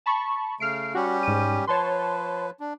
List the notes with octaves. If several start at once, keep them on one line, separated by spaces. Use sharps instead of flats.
A5 B5 C#6
C#3 A3 F6 C7 D7
G3 C#4 F#4 G4
G#2 D#7
F3 B4 C#5 A5 C6
D4